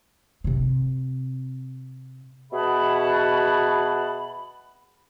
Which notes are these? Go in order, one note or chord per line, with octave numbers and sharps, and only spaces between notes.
C3 C4
B2 G#4 E5 F#5 A5 B5